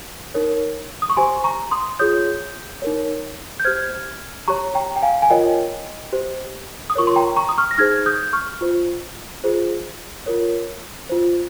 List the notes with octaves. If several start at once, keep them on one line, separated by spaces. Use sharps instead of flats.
D#4 A#4 C#5
D#6
C#6
G4 C5 G#5 C6
A#5 C#6
C6 D#6
F4 G#4 C#5 D#6 G6
D#4 A#4 C#5
G6
G4 C5 F6 G#6
G4 C#5 A#5 C#6
G5 A#5
G5
F5 G#5
G#5
F4 A#4 C#5 D#5 G5
G4 C5
D#6
F4 A#4 C#5 C#6
C6
G5 A#5
A#5 C#6
D#6
C#6 F6
A#6
D#4 G#4 C5 F6 G#6
D#6 G6
C#6 F6
F4 C5
F4 G#4 C5
F4 A#4 C#5
F4 C5